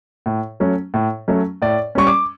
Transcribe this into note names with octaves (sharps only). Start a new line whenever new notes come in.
A2
F#3 A3 C#4
A2
F#3 A3 C#4
A2 D5
G3 C#4 C#6
D6